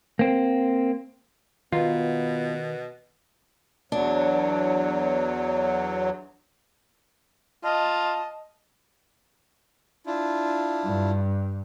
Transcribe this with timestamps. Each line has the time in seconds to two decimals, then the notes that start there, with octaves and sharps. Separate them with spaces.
0.19 A#3 C4
1.72 B2 D#3 B3 F4
3.92 E2 F#3 D4
7.64 F4 D#5 A5
10.06 D4 E4 F4
10.84 G2